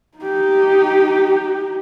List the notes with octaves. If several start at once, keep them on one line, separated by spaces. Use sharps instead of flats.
D#4 G4